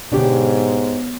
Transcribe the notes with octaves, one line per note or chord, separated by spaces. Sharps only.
G#2 B2 D3 B3 D4 G4 C#5